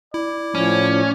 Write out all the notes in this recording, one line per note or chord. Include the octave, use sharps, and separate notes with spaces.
E4 D5
A2 F3 C#4